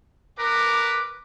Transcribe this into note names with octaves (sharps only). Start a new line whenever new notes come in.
A#4 B4 D6